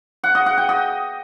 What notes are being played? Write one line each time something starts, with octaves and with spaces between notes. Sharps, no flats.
F#5
D#5
F#5
G5
D#5